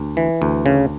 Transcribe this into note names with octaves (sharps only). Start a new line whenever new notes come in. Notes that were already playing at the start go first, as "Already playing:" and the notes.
Already playing: D2
E3
D2
C#3